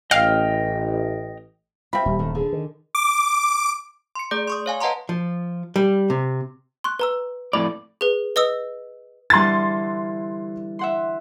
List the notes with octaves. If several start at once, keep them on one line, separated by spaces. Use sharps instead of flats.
A1 D#5 F5 G5 F6
C4 F4 E5 B5
D#1 G3
D#3 A3
D3 G#4 A4
D#3
D6
C6 C#7
A3 G#4 D5 G6
C6 C#6 D#6
C#5 F5 G#5
B4 D#5 F#5 A5 A#5 C6
F3
G3
C3
C6 C#6 F#6
B4 A#5 E6
F2 A2 D5 B5
G#4 B4
B4 D#5 D#6 E6
D3 E3 G3 C6 A6
E5 F#5 C6